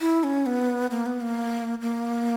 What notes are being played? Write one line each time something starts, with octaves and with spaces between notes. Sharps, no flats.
E4
C#4
B3
A#3
B3
A#3
A#3